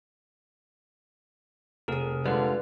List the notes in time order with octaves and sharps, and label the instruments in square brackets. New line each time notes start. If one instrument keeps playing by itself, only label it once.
[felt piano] F1 D#7 [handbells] G#4 A#4
[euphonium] D3 [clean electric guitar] G3 G#3 F4 [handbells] B4